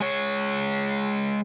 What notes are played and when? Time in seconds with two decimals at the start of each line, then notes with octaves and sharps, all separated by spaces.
0.01 G#3 C#5